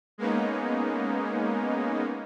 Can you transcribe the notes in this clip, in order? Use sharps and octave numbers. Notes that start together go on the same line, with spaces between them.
G#3 A#3 B3 C#4 D#4